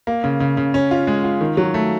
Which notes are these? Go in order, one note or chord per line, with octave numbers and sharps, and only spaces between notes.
A#3
C#3
C#3
C#3
C#4
F4
G#3
F4
D#3
F#3
A3